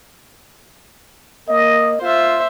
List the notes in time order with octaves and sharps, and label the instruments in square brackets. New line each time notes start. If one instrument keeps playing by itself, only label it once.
[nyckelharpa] A#3 [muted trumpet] D#5
[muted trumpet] F4 [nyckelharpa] C5 E5